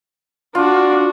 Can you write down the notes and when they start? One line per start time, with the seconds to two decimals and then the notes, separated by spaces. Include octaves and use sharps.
0.55 D4 F4 F#4